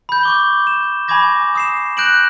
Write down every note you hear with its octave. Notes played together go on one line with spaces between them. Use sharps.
B5 G6
C#6 D6 G7
E7
G#5 B5 C#6 D6 G#6 A#6
D#6 C7 E7
F#6 G6 A#6 D7 E7 F#7